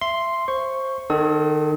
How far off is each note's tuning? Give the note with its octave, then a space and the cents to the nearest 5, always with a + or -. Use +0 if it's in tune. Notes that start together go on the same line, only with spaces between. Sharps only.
E5 +25 C6 +0
C5 +15 C#6 +0
D#3 -30 A4 +0 D#6 +40